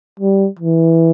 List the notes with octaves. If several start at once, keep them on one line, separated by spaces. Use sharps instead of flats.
G3
E3